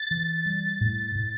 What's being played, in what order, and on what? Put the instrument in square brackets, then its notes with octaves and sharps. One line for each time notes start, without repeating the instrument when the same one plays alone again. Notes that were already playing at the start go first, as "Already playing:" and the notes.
Already playing: [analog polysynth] A6
[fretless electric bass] E3
G3
A2
A2